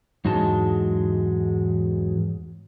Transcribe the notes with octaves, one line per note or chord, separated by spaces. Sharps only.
E2 G#2 F#3 G#3 A5